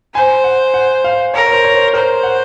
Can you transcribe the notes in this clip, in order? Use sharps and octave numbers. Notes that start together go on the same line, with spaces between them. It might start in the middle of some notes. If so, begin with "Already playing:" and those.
C5 G#5
F#5
F#5
F5
A#4 C#5
C#5
C5
C#5
C5
A#4 C5
F#5